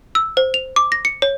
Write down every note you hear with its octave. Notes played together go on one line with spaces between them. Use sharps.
E6
C5
F7
D6
A#6
C#7
C#5